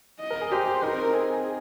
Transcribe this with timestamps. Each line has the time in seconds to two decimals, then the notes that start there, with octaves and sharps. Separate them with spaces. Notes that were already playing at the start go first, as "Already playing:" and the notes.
0.20 D#5
0.31 A#4
0.41 G#4
0.52 G4 C5
0.67 G4
0.83 D#4 A#4
0.93 C4
1.04 C4
1.14 G#4